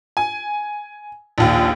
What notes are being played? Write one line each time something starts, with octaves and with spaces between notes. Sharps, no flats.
G#5
A#1 D#2